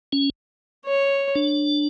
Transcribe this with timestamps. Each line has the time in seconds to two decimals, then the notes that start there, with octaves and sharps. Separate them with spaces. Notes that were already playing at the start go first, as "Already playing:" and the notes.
0.12 C#4
0.86 C#5
1.35 D4